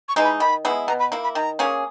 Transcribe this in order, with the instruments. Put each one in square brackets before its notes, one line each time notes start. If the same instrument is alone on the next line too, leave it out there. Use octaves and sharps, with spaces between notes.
[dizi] C#6
[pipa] E3 G#3 D#4
[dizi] B5
[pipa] D#3 [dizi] B5
[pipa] G#3 B3 E4
[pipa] B2 [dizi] A#5
[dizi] B5
[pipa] A#3 E4
[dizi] B5
[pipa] D#3 [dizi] A#5
[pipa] A#3 C#4 G#4